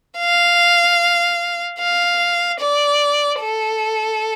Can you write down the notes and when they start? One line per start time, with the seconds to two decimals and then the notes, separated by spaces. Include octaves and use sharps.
0.18 F5
1.79 F5
2.60 D5
3.40 A4